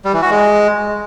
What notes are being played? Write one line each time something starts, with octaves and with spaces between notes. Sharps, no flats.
G3
E3
F#4
G#3